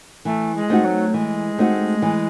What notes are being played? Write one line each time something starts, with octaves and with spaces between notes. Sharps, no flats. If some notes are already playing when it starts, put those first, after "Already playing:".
E3 A3
G#3
A3 C4 D#4 F#4
F#3
E3 G#3
A3 C4 D#4 F#4
E3